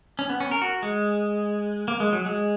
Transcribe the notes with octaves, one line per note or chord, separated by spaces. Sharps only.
C#4
B3
C#4
A#4
F#4
G#3
A#3
G#3
F#3
G#3